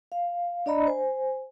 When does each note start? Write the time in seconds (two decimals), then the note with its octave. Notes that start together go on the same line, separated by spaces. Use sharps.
0.12 F5
0.66 D4 D5 D#5 A#5 B5
0.87 C5 G#5